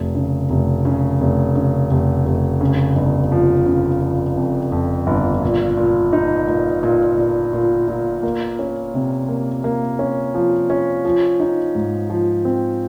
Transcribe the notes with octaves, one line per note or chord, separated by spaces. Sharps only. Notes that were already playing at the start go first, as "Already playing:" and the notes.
Already playing: F1
C#3
F1
C#3
F1
C#3
F1
F1
C#3
G1
F3
C#3
F3
F2
F2
G1
A#2
A#2
D#4
A#2
A#2
A#2
A#2
A#2
A#3
C#4
C3
A#3
A#3
C#4
F3
C#4
F3
D#4
G#2
F3
C4